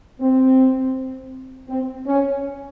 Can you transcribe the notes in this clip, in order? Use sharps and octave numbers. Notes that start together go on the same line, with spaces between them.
C4
C4
C#4